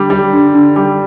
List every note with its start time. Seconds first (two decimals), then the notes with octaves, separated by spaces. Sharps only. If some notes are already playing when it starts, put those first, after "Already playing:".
Already playing: D3 G3
0.10 G3
0.33 D3
0.54 D3
0.76 G3